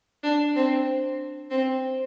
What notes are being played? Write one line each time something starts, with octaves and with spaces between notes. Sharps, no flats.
D4
C4
C4